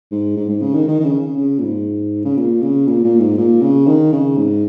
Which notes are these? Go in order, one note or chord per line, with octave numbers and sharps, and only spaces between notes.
G#2
G#2
G#2
C#3
D#3
D#3
D#3
C#3
C#3
C#3
A#2
G#2
C#3
A#2
C#3
A#2
A#2
G#2
A#2
C#3
D#3
C#3
G#2